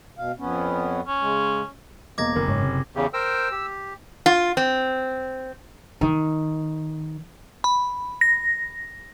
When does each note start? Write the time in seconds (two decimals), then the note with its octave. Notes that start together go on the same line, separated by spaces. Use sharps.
0.18 B2 F5
0.39 F2 B3 C#4
1.08 C#4
1.21 C#3 G#3
2.18 E1 A#3 D#5 D6 G#6 A#6
2.36 F#1 A#4
2.48 G#2 C#5
2.63 C3
2.95 E2 C#3 G4
3.13 A#4 C5 G5 E6
3.51 G4
4.26 F4
4.57 C4
6.01 D#3
7.64 B5
8.21 A#6